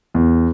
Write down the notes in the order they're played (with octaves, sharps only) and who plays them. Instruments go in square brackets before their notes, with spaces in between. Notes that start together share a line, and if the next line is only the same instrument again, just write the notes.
[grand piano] E2